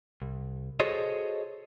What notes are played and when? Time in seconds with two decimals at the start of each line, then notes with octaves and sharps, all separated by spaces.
0.22 C2
0.80 F#4 G#4 A4 C5 C#5 D#5